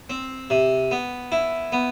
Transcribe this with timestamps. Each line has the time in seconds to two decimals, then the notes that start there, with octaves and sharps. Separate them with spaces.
0.10 C4
0.50 C3
0.91 B3
1.32 E4
1.72 B3